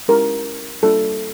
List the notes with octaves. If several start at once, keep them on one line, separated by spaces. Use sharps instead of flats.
G#3 C#4 E4 G4 A#4
G3 A#3 D4 F4 A4